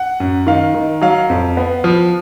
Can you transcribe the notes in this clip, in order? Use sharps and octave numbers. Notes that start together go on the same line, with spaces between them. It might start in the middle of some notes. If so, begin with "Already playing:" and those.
Already playing: F#5
F#2
D#3 F5
D#3
F#3 F5
F2
B3
F3